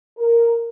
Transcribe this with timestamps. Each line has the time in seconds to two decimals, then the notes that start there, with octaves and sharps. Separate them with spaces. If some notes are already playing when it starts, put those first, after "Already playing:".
0.18 A#4